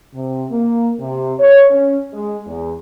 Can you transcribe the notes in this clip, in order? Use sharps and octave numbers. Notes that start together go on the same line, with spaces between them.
C3
A#3
C3
C#5
C#4
G#3
E2